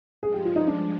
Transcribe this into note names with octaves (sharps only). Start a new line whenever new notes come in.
G2 F3 G#3 G#4
G4
F4
D#4
D4